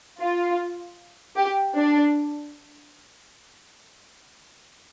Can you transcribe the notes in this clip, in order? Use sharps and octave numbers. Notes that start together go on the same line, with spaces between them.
F4
G4
D4